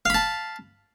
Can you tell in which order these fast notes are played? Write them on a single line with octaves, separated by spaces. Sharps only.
F5 B5 A5